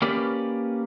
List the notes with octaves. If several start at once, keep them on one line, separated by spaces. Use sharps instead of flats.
A#3 C#4 G4 A#4 B4 D5